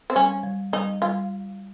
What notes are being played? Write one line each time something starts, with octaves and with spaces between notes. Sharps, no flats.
C4
G3 C#4
G3
G3 D#4
G3 F4